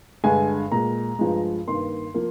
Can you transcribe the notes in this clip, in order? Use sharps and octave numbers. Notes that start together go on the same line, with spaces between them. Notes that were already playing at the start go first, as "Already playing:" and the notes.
G2 D3 G#3 G#5
A#2 G#3 A#5
G2 F3 G#3
G2 D#3 A#3 C6
F3 A#3